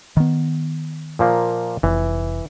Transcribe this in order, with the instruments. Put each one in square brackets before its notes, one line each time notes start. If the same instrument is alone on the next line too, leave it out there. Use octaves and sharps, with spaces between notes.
[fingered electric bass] D#3 B3
[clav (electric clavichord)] A#2 F3 A#3
[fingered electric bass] F1 [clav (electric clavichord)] E3